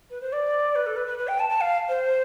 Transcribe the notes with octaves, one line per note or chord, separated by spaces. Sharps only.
B4
C5
D5
B4
A4
B4
B4
B4
G5
A5
A5
F5
C5